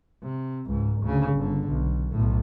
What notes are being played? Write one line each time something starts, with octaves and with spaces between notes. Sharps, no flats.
C3
C#2 G#2
D2 C#3
G1 D3
B1
B1 A2